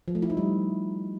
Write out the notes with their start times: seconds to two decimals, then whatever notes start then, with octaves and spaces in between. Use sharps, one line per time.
0.08 F3
0.15 A3
0.22 E4
0.30 D#4
0.37 G3